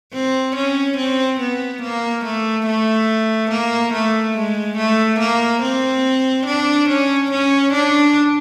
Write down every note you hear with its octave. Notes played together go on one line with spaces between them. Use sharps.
C4
C#4
C4
B3
A#3
A3
A3
A#3
A3
G#3
A3
A#3
C4
D4
C#4
C#4
D4